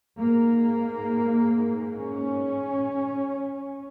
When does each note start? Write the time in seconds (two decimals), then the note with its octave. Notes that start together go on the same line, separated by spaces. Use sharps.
0.18 G#2 A#3
1.98 C#4